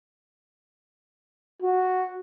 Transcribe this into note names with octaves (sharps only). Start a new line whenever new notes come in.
F#4